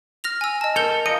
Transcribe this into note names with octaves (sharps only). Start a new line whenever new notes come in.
F6 A#6 F7
G#5 E6
D#5 A5
A4 A#4 G6 F7
F4 A#4 D#5 C#7